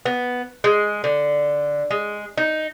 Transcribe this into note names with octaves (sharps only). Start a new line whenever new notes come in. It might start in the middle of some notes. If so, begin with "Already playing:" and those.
B3
G#3
D3
G#3
D#4